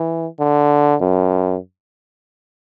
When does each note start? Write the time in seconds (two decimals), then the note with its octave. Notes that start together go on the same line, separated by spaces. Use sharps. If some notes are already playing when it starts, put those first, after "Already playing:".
Already playing: E3
0.40 D3
1.01 F#2